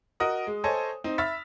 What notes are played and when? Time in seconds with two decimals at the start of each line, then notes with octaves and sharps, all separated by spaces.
0.20 F#4 A#4 D#5 F#5 D#6
0.47 G#3
0.64 A4 C5 C#5 D#5 G#5
1.04 C4 D#4
1.18 E5 B5 E6 F6 A6 B6